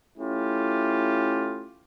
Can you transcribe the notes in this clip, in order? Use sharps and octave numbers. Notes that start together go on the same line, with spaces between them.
A3 C#4 E4 F4 G4